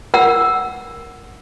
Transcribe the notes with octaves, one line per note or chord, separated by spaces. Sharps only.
A#4 F#5 E6